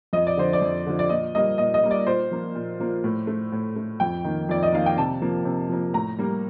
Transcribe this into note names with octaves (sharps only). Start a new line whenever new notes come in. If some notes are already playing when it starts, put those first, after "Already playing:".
F2 D#5
D5
D3 F3 C5
D5
F2
D3 F3
D5
A#2 D#5
G3 A#3 D#5
A#2 D#5
D#5
G3 A#3
D5
A#2 C5
F3 A#3
A#2
F3 A#3
A2
A3
A2
A3
F2 G5
D#3 A#3
F2 D5
D#5
D#3 A#3 F5
G5
C3 A5
F3 A#3
C3
F3 A#3
A2 A#5
G3 A#3